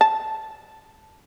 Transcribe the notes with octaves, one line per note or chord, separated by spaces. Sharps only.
A5